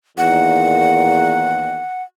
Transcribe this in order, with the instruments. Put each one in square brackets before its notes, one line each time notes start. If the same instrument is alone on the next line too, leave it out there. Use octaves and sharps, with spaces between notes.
[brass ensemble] E2 A#2 D#3 [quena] F#5